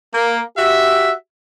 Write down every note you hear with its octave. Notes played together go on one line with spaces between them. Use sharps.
A#3
F#4 G4 E5